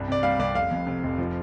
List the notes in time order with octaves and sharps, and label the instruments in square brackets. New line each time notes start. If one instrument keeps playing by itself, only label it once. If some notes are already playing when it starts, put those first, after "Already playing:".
Already playing: [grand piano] C2 G2
C3 D5
G3 F5
C2 D5
F1 F5
F2
C3
F1
F3